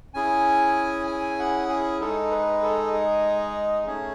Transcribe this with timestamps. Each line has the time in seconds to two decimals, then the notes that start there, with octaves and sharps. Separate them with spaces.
0.14 C#4 E4 G#4 G#5
1.07 G#5
1.39 F#5
1.69 G#4
2.00 G#3 D#4 G#4 A4
2.31 B4
2.63 A4
2.94 G#4
3.86 A3 C#4 G#4